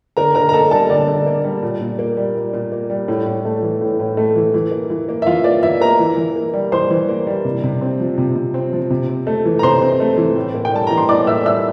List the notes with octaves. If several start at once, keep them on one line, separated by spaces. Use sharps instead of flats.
D3 A#4 A#5
D3 A#4 A#5
A#5
A#3 A4 A5
G3 A4 A5
D3 D5
D3
A#3
G3
A#2
A#2
A#3
G3
A#2
A#2
A#3
G3
A2
A2
A3
E3
A2
A2
A3
E3
E3
A#3
E3
A#3
E5
E3 F4 F5
A#3 D5
E3 E4 E5
A#3 A#4 A#5
E3
E3
A#3
G3
E3 C5 C6
E3
A#3
G3
C3
C3
C4
F3
C3
C3
C4
F3
C3
C4
A3
E3
A#5
C3 C5 C6
C4
A3
E3
A2
A#3
G5
G3 A5
E3 A#5
C6
A2 D5 D6
A#3 E5 E6
G3 E5 E6